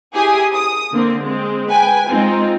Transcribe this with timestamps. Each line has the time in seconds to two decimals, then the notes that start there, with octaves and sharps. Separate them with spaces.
0.15 E4 G4 G#4 G#5 D#6
0.54 D#6
0.93 D3 A#3 C4
1.22 G#3 C4
1.70 B4 G5 G#5
2.08 G#3 C4 D#4 F4